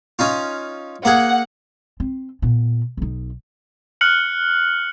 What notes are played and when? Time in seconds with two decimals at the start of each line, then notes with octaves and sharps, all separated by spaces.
0.19 C#4 D#4 F4
1.05 A#3 G#4 F#5
2.00 C4
2.42 A#2 B3
2.97 B1 D#4
4.01 F6 F#6 C#7 F#7